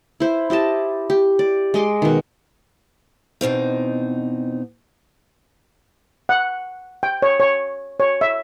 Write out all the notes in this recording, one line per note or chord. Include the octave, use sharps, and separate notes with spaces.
E4 C5
E4 G4 D#5 A5
G4
D5
G#3 D#5 C6 D6
B2 D#3
E2 B2 C4 D#4
F#5
G5
C#5
C#5
C#5
E5